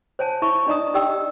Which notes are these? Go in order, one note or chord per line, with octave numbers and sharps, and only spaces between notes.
C5 C#5 G#5 A5
E4 E5 B5 C#6
D4 D#4 D5 D#5 A#5 D#6
D#4 G4 D5 D#5 G5 E6